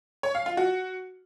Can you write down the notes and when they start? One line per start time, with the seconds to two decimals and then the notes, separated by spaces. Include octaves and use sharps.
0.23 C#5
0.35 F5
0.46 F4
0.57 F#4